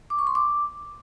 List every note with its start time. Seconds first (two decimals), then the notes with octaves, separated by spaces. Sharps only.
0.10 D6
0.19 C#6
0.27 C6
0.35 D6